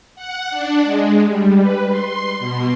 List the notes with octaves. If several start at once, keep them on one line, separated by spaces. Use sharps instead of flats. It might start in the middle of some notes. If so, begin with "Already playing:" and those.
F#5
D4
G#3
G3
B4
C6
B2